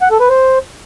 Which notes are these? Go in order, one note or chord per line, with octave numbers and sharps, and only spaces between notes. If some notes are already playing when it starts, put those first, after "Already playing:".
F#5
A4
B4
C5